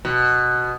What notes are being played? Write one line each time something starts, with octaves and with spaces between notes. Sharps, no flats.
B2